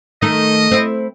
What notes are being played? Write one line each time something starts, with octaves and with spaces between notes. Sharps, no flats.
D#3 A3 D#4 D#5
C4 E4